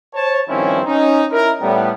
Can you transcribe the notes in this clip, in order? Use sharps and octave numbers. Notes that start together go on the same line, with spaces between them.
C5 C#5 A5
G2 D#3 F3 C4 C#4 E4
C#4 D#4
E4 A#4
A2 G3 B3